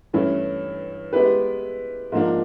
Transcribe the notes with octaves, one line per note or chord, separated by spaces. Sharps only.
G2 E3 A3 C#4 E4
G#3 B3 E4 G4 B4
G#2 F3 A#3 D4